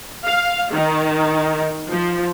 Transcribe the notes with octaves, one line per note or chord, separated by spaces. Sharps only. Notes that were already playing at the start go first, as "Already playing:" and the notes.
F5
D#3
F3